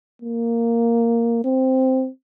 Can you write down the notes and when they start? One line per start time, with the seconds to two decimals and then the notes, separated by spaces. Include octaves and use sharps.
0.22 A#3
1.44 C4